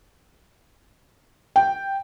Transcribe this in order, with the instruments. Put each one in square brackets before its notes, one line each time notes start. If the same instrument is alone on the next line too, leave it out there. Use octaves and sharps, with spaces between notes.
[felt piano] G5